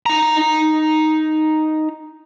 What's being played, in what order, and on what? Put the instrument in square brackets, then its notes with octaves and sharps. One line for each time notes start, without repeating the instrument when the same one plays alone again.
[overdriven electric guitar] D#4 A#5